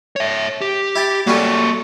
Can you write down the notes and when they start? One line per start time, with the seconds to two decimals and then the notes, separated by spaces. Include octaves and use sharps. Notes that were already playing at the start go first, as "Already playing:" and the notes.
0.16 C#5 E5
0.61 G4
0.96 E4 G5 A5
1.27 F#3 G3 A#3 C#4 A4